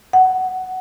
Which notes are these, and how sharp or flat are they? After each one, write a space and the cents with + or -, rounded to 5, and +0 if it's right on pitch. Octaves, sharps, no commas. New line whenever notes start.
F#5 +10